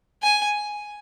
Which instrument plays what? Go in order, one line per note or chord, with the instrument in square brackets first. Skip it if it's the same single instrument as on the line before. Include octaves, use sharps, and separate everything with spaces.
[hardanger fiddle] G#5